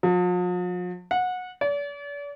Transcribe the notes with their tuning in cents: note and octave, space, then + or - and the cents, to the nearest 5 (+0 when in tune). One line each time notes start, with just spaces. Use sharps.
F3 +45
F#5 -20
D5 -40